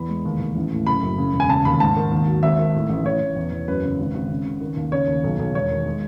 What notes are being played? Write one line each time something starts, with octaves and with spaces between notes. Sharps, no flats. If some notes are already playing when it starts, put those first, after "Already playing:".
Already playing: E2 B5
G#3
D#2
D#2
A1
A2
F#1 B5
F#2
C#3
E1
G#5
C#3 A5
D#2 B5
G#2 A5
D#3
D#2
F#3
G#1 E5
D#3
A2
A1
A1 C#5
A1
E2
E2
F#2 B4
C#3
G#1
G#1
C#3
C#3
D#3
D#2
C#3 C#5
D#2
B1
B1
E1 C#5
D#3
G#3